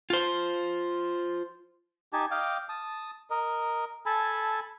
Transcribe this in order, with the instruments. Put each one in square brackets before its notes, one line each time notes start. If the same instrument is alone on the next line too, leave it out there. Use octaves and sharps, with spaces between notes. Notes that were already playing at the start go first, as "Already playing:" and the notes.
[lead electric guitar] F4 C5
[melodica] D#4 G4 G#5 A5
D#5 F5 G5 D6
A5 D#6
A#4 D#5
A4 G#5 A5 B5